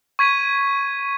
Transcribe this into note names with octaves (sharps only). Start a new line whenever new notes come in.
C#6 G#6 B6 D#7